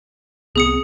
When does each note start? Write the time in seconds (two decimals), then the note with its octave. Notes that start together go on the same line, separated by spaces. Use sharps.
0.56 C2 B3 C4 G#4 D#6 C#7